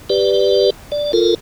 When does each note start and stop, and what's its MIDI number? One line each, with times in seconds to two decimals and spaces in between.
0.10 0.70 67
0.10 0.70 71
0.10 0.70 74
0.92 1.12 74
1.13 1.35 65
1.13 1.35 69
1.13 1.35 70